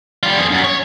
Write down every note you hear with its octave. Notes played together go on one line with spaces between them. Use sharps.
G3 F4
F2 G#4
F#2
C#5